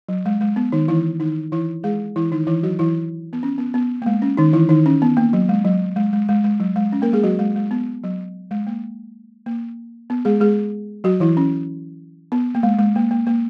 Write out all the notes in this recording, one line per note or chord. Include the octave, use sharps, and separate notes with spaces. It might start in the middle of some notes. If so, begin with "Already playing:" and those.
F#3
G#3
G#3
B3
D#3 D#4
E3 E4
D#3 D#4
E3 E4
G#3 G#4
E3 E4
D#3 D#4
E3 E4
F#3 F#4
E3 E4
B3
C#4
B3
B3
A#3
G#3
C#4
D#3 D#4
E3 E4
D#3 D#4
C#4
B3
A#3
F#3
G#3
F#3
G#3
G#3
G#3
G#3
F#3
G#3
C#4
A#3 A#4
G#3 G#4
F#3 F#4
G#3
G#3
B3
F#3
G#3
A#3
A#3
B3
G#3 G#4
G#3 G#4
F#3 F#4
E3 E4
C#4
B3
A#3
G#3
G#3
A#3
A#3
A#3